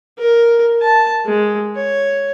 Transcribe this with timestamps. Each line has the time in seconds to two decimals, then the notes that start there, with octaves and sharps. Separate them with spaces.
0.19 A#4
0.81 A5
1.26 G#3
1.76 C#5